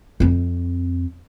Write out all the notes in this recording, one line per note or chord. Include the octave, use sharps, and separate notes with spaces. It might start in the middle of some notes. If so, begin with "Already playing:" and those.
F2 C4